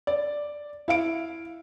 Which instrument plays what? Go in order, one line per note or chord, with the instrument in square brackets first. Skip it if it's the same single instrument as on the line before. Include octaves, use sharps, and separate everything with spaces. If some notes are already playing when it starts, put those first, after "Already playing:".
[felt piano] D5
E4 F5 D7